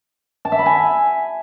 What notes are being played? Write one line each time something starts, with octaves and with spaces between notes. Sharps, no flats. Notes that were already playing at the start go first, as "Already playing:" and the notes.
A5
E5
B5
G#5